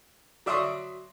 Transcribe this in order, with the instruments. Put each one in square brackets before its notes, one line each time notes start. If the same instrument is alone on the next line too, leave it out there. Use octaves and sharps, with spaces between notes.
[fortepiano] F#3 D5 E5 C6 C#6 D#6